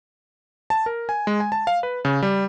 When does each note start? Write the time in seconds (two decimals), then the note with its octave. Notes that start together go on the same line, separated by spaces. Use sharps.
0.70 A5
0.86 A#4
1.09 G#5
1.27 G#3
1.40 G#5
1.52 A5
1.67 F5
1.83 B4
2.05 C#3
2.22 G3